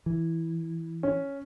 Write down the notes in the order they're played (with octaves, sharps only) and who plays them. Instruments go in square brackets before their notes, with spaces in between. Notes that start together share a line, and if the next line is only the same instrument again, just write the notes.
[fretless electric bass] E3
[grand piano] C#4